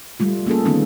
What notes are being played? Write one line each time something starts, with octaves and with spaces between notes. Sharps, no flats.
G3 A3 F4
A#3 C#4 G#4 A4
D3 D#3 G#3 B3 C#4 D#4